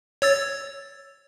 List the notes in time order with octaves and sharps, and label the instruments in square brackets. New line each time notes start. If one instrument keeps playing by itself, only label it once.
[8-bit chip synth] C#5 E6 A6